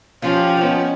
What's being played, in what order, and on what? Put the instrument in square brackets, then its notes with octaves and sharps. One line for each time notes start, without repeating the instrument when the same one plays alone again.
[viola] F3 [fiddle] C#4 [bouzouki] F4 G4
[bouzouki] D#3 B3 [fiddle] C#4